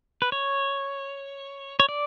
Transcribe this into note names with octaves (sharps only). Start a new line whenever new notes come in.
B4
C#5
C#5
D5